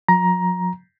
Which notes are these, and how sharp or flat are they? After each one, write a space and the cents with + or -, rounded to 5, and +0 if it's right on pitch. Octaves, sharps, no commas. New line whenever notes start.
F#3 -45 A#5 +15